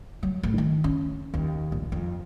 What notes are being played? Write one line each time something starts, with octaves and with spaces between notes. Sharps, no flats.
F#3
A1
D#3
C#4
D#2
A#1
F2